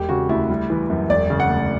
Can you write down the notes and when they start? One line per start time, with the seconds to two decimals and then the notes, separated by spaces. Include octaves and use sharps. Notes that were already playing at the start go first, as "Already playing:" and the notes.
Already playing: E1 G4
0.09 C#3 F#4
0.29 D2 E4
0.50 G3
0.70 E3
0.90 F#2
1.10 E1 D5
1.30 C#3
1.40 F#5
1.50 D2